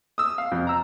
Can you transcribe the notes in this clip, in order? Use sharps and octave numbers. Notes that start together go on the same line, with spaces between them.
D#6 E6
F5
F2
A#5 E6